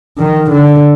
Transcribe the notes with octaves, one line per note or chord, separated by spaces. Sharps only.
D#3
D3